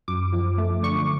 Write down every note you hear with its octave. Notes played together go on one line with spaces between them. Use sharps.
F#2 D6
F3
A3
D3 C#6